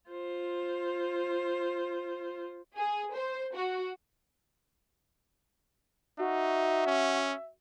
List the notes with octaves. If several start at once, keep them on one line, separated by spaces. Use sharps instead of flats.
F4 C5
G#4
C5
F#4
D#4 F#4 E5
C#4